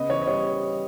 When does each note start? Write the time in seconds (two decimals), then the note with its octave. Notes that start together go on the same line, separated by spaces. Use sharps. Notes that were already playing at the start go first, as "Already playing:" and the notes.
Already playing: C#3 B3 D#5
0.09 E3 C#5
0.22 D#5
0.28 G3 C#5